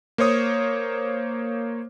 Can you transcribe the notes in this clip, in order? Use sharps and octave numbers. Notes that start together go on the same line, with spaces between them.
A#3 C5 C#5 D#6